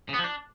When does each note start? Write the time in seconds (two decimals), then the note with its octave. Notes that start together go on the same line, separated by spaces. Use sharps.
0.09 C#3
0.14 B3
0.19 F3
0.24 D4